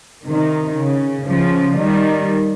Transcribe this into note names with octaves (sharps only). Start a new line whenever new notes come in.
C3 D#3
C#3
C#3 F3
D#3 G3